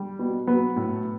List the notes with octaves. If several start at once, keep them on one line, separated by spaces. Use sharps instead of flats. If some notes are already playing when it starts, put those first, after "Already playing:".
Already playing: G3
B2
F#3 B3
A2